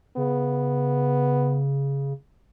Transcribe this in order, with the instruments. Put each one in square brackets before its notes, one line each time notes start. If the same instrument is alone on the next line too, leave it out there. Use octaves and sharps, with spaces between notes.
[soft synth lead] C#3 [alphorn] B3